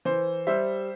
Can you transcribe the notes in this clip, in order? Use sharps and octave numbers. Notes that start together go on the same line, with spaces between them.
E3 C5
G3 C5 E5